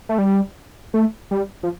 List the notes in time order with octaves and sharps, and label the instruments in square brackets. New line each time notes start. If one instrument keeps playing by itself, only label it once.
[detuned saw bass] A3
G3
A3
G3
F3